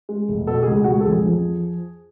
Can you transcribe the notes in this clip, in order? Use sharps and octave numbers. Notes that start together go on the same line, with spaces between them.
G#3
F1
B2 A4
C#2 G#4
C#2 F#4
G#4
A4
F2 G#4
F3